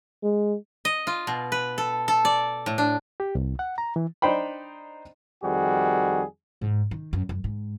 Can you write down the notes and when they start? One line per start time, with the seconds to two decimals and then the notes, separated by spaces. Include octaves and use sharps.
0.23 G#3
0.85 D#5
1.07 F4
1.27 B2
1.52 B4
1.78 A4
2.08 A4
2.25 D5
2.66 A2
2.78 D4
3.20 G4
3.35 C2
3.59 F#5
3.78 A#5
3.96 E3
4.22 D4 D#4 C5 G5 B5
5.43 F2 D#3 G3 F#4 G#4
6.61 G#2
6.91 D#3
7.13 F#2
7.29 F#2
7.44 G#2